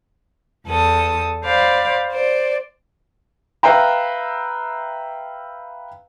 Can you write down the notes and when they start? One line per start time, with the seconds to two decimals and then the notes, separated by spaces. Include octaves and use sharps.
0.66 E2 A4 D#6
1.43 C5 D5 F5 B5
2.13 C5 D5
3.63 B4 E5 F5 G5 A#5